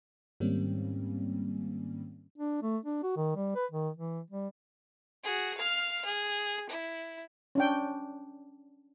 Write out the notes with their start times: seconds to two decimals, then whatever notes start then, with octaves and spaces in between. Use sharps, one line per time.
0.40 G#2 D#3 G3 A#3 C4 C#4
2.38 D4
2.63 A3
2.86 D4
3.03 F#4
3.17 D#3
3.36 G3
3.56 B4
3.72 D#3
3.97 E3
4.30 G3
5.24 F#4 G#4
5.57 F5 F6
6.05 G#4
6.69 E4
7.55 C#4 D4 G5